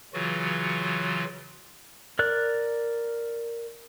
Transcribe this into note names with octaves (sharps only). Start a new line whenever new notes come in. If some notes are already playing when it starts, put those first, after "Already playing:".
C#3 E3 F#3 F4 F#4
A#4 D5 F#6